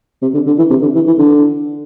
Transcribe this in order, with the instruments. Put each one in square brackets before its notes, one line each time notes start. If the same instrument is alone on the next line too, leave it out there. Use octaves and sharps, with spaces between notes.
[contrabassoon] C3
D3
D3
E3
C3
D3
E3
E3
D3